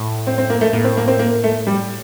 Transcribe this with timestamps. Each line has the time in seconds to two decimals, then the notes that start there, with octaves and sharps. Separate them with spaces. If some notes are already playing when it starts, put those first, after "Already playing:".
Already playing: A2
0.27 C4
0.38 C4
0.50 A#3
0.61 A3
0.73 A2 A#3
0.84 C4
0.97 A#3
1.08 C4
1.19 A#3
1.44 A3
1.67 G3